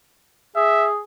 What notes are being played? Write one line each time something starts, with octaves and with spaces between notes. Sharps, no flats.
G#4 E5